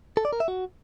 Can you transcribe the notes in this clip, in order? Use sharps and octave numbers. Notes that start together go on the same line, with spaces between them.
A4
D5
A#4
E5
F#4